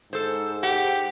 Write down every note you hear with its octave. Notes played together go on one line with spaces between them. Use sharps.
G#2 A4 C5
G4 F#5